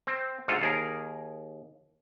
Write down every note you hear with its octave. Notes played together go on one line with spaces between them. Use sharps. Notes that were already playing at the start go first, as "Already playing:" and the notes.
C4
D2 G#2 F4 A4
D#2 G#4 A#4